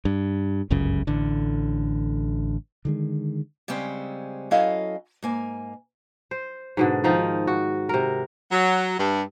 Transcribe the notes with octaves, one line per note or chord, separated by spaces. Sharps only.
G2
G1 C#2 F#2 C#3
A1 D3
D3 D#3 G#3
C#3 G3 G#3 C4 C#4
F#3 C#4 E4 A4 D#5 F5
G#2 A#3 G#5
C5
G#2 B2 D3
D#3 F3 D#4
F#4
C3 A#4
F#3
G2